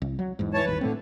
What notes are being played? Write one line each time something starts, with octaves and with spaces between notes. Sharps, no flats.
C2
F#3
E2 G#2
E3 C#5 A5
D1 G1 D#2 B4
A2 D3 A3 C4